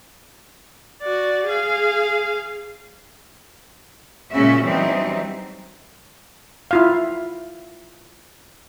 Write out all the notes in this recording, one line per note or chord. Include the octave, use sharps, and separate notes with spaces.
F#4 D5
G#4 F5
A#2 C#3 G#3 C#4 F#4 E5
E3 F#3 G3 C4 D4 D#4
E4 F4 F5